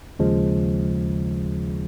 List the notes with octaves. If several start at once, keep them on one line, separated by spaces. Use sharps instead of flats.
D#2 C#3 F3 G#3